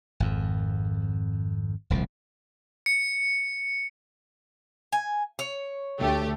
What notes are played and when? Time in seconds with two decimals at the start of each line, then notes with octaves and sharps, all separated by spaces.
0.20 G#1 F2
1.90 D#1 C2 D3 F3
2.86 C#7
4.92 G#5
5.39 C#5
5.99 D2 A3 G4